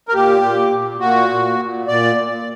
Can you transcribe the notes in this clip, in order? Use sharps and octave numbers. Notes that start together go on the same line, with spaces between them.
A#4
A#2 G4
A#2
A#2
A#2 F#4
A#2
A#2
A#2 D5
A#2